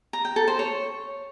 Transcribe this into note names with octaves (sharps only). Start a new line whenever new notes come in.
A#5
G5
A4
C5
C#5